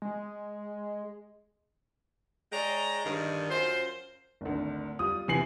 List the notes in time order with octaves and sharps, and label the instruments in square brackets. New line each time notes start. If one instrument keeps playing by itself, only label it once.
[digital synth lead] G#3
[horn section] G#3 C#5 D5 G5 A#5
G2 D3 D#3
F#2 F4 C5
[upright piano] G#1 D2
G3 F4 D#6
C3 E3 B3 G#5 C7 F#7